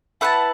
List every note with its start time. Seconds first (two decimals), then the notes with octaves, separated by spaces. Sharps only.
0.21 E4 B4 F#5 A5